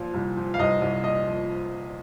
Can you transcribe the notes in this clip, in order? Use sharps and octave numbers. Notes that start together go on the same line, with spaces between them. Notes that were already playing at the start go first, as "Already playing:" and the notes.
Already playing: A#2 F3
C2
F3
F5
C2 D#5
C2
A#2 D#5
F3